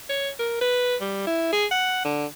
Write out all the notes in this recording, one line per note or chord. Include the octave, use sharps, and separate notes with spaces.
C#5
A#4
B4
G3
E4
G#4
F#5
D3